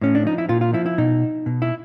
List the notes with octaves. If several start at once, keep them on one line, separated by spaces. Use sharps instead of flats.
A2 C#4
D4
F3 D#4
E4
A#2 F4
F4
F3 E4
E4
B2 D#4
B2
E4